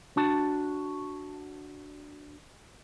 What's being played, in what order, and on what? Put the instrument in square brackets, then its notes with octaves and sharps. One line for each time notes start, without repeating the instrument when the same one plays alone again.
[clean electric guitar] D4 F#4 A5